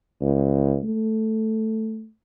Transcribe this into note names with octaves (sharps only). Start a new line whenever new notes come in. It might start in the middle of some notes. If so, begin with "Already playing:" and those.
C#2
A3